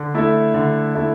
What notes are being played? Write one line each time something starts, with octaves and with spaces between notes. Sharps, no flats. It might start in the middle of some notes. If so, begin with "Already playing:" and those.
Already playing: D3
A3 E4 A4 E5
D3
A3 E4 A4 E5